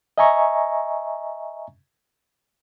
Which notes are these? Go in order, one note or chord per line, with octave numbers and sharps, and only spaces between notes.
D#5 E5 G#5 A#5 C#6